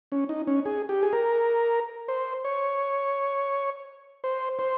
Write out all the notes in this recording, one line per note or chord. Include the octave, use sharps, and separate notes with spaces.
C#4
D#4
C#4
G#4
G4
G#4
A#4
C5
C#5
C5
C5